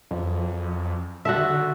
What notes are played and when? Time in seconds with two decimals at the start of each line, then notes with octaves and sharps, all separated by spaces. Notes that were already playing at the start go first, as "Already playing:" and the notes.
0.11 F2
1.25 D3 F#4 A4 E5